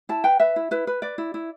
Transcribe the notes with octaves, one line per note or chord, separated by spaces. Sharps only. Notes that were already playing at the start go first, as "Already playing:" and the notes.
E4 A5
B4 G5
B4 E5
E4
E4 B4
B4
B4 D5
E4
E4